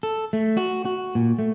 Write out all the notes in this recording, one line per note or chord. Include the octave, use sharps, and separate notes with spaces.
A4
A3
F#4
F#4
A#2
A3